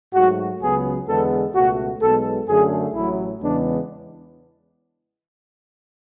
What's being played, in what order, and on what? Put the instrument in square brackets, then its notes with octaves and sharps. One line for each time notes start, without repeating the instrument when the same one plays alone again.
[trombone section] G#2 F#3 A3 F#4
C#2 C#3 F#3 B3 G#4
E2 D3 G#3 B3 A4
C#2 B2 A3 F#4
B1 B2 G#3 B3 A4
F#2 D3 A3 G#4
A1 A2 F#3 E4
E2 C#3 E3 G#3 B3 D4